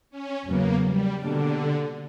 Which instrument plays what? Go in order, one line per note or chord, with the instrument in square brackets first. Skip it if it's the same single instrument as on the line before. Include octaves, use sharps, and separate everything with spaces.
[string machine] C#4
[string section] E2 C#3 F#3 B3 [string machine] A#3
[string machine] G3
[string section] B2 G3 A#3 D4 [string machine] D3